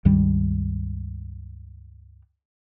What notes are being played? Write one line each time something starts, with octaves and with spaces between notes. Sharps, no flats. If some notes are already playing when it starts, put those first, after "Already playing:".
C#2 G2 D#3 G3